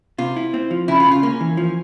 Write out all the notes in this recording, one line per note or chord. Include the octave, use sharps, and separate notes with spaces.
C3 F4
E4
C4
F3
C#3 E4
F4
C#3
F4
A#3 C#4
E3
F3